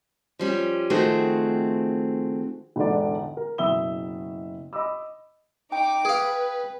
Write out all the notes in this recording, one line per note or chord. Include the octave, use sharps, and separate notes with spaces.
F3 G3 C#4
D#3 F3 A3 C4 F#4 G#4
E1 G#2 D3 D5
A#4
F#1 B2 E5 D#6 E6 G7
D#5 B5 D6 E6
D#4 G5 D6
G#4 B4 F5